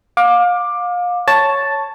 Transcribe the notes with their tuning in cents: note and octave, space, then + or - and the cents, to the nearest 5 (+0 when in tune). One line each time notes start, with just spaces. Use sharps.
F5 +30 D6 +10
C#5 +0 A5 +0